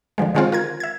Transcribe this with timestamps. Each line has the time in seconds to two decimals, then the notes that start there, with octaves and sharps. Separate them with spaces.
0.18 D3 D#3 F3 G#3
0.35 D3 D#3 G#3 C4 F4 C5
0.52 F4 A#4 G#6
0.80 E5 G#6